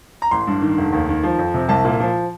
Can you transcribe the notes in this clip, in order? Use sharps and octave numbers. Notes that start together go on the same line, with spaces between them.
A#5
A1 C6
G2
D#3
F1
D#2
D#3
F3
F2
C3
C2 A5
A#2
F3